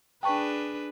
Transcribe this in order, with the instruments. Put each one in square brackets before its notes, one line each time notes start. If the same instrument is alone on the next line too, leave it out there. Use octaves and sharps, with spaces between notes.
[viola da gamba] D4 G#4 B4 [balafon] G5 A5 C#6